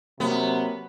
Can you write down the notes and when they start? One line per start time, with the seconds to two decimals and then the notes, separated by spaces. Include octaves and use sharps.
0.20 C3 F#3 A#3 B3